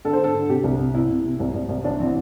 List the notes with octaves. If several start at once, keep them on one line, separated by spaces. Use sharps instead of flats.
D3 A4
C5
D3 A4
D3
C3 G4
C2
C3
C3 E4
C3
C3
C2
C2
C2
A1 D4
E3 C4